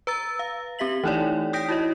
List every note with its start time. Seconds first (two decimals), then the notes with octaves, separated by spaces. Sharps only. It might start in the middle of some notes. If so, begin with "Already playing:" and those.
0.07 B4 A#5 E6 A6
0.39 F5
0.79 C4 G4 E5 B6 F#7
1.04 E3 A3 D#4 E4 C#5 D5
1.53 G5 D#6 G6 A#6 B6 D7
1.69 E4 F#4 C#5 D#5